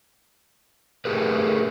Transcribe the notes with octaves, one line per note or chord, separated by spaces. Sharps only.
A3 G4 G#4 A#4 B4